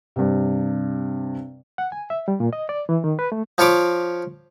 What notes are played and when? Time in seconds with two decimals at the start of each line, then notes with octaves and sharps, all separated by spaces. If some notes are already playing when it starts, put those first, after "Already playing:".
0.16 G2 C3
1.78 F#5
1.92 G#5
2.10 E5
2.28 G3
2.40 A#2
2.53 D#5
2.69 D5
2.89 E3
3.04 D#3
3.19 B4
3.32 A3
3.58 F3 F4 C#5 B5 D6